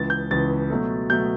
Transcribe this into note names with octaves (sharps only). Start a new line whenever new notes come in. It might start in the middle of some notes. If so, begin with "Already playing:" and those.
Already playing: C#2 C#3 E3 A6
G6
C#2 C#3 E3 A6
B2 F#3 A3
B2 F#3 A3 G6